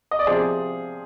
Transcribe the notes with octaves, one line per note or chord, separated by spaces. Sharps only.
D#5
D5
C3 F3 G#4 C5